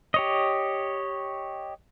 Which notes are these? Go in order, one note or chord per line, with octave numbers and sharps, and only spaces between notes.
G4 C#5 D#5